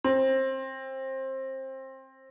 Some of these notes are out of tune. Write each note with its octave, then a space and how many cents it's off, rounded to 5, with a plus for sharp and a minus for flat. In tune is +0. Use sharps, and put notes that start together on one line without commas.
C4 +20